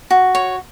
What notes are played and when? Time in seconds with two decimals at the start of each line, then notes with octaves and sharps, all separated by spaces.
0.10 F#4
0.35 C#5